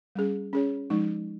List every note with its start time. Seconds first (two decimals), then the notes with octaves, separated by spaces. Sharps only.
0.16 G3 C#4 G#4
0.53 C#4 G#4 C#5
0.90 F3 G#3 D#4